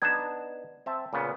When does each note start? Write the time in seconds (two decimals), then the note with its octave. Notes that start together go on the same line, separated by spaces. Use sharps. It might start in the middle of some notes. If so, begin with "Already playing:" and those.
0.02 B3 D4 D#4 G#6 E7
0.86 C4 E5 A5
1.13 A#2 C#3 B3